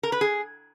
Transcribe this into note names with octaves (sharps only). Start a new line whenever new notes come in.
A#4
B4
G#4